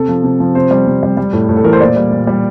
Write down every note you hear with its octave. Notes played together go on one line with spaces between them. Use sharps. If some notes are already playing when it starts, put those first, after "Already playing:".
Already playing: C3 A4
F3
C3
F3
C3 C5
G3
C3
G3
G3
A2
A2
A4
E3 A#4
C5
A#2 D5
G3
A#2
G3